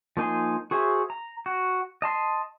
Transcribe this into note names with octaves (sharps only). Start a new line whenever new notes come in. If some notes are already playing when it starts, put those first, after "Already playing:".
F3 A#3 D#4 G#5 C6
F#4 G#4 C5 E5
A#5
F#4
D#5 A5 C6